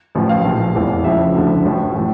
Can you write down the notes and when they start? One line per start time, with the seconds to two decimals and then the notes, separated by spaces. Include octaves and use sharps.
0.15 A1 A2 F3
0.29 F5
0.45 A#1 A#2 F3
0.75 F1 E2 E3
1.04 C#2 C#3 F3 E5
1.34 D2 D3 F3
1.65 A1 A2 F3
1.96 A2 E3